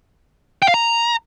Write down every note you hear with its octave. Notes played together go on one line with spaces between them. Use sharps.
G5
F5
A#5